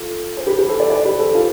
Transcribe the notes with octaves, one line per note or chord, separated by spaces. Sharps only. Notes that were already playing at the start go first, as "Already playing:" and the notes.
Already playing: F4 A4
C5
G4 B4
G4 B4
A4 C5
B4 D5
B4 D5
G4 B4
A4 C5
F4 A4